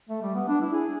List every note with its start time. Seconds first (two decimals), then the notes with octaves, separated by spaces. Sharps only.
0.09 A3
0.22 G3
0.35 B3
0.48 D4
0.61 E4
0.73 G#4